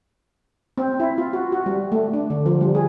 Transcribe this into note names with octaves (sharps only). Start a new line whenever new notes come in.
C4
E4
F4
F#4
F#4
G3
A3
D4
D3
F3
G3
G#4